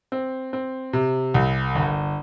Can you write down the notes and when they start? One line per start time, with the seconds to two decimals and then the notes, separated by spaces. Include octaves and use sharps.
0.12 C4
0.53 C4
0.93 C3
1.34 C2
1.75 G1